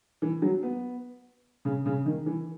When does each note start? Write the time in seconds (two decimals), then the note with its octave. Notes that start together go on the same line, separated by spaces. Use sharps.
0.22 E3
0.42 F#3
0.63 B3
1.65 C#3
1.86 C#3
2.06 D#3
2.26 E3